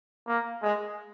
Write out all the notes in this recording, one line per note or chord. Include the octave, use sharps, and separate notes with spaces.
A#3
G#3